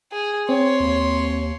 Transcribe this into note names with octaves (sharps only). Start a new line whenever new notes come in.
G#4
C4 C#5 C6
D#2